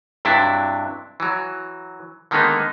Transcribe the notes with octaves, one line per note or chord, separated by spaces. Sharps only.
G2 C3 F#3 D4 E4
E3 F#3
D3 D#3 G#3 A#3 B3 D#4